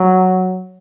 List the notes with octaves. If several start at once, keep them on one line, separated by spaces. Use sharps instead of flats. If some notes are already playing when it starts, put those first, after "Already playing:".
Already playing: F#3